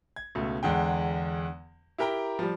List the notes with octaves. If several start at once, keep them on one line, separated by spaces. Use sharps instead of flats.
G#6
C#2 B2 A3
E2 D3 G#3 G5
E4 G4 A#4 G5 A#5
F3 G3